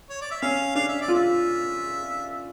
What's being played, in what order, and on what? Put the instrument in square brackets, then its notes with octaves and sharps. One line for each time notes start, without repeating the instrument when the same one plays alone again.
[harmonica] C#5
D5
E5
[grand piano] C#4 [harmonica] F5
[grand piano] D4 [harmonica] F5
[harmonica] E5
D5
[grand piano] F4
[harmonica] E5